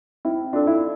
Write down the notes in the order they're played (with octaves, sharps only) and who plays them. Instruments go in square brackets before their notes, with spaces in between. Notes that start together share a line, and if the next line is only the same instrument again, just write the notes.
[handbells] C4 [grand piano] E4
[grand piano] D4 [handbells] F4 A4 D5
[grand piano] E4